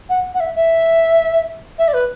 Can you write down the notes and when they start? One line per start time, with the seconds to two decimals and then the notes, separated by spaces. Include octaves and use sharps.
0.09 F#5
0.34 F#5
0.40 E5
0.55 E5
1.78 E5
1.88 D5
1.93 B4